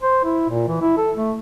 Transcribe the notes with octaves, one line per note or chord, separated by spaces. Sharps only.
C5
E4
A#2
E3
E4
A4
A3